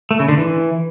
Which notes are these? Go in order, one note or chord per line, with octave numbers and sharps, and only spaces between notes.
A3
C#3
D3
E3